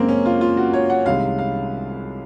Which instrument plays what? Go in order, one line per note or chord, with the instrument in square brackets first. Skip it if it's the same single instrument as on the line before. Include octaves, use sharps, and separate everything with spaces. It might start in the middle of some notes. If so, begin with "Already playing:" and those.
Already playing: [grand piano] F#2 C#3 G#3 A#3 C4
C#4
F4
F4
F#4
C#5
F#5
C2 C3 D#3 G#3 F5
F5